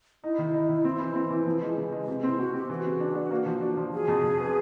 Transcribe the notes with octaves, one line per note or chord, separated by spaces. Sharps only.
D#4 E4
D#3
D#4
D#3
C4
E3
C4
E3
F3
G#3
C#3
G#3
C3
C4 E4
C4 F#4
C4 G4
E3 F#4
C#3
D4
D4
A#3
F3
D4
F3
F#3 G#4
F2
F2
B3